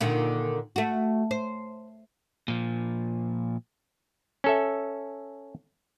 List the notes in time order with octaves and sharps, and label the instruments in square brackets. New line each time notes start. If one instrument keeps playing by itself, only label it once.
[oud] A#2 D3 D#3
A3 F#4
C5
[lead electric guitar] A#2 F3
[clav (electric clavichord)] C#4 A4 E5